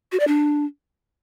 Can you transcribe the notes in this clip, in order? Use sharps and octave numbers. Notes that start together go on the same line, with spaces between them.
F#4
D5
D4